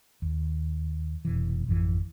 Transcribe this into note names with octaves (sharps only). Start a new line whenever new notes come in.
D#2
F1 B2 E3
G#1 F2 D3 E3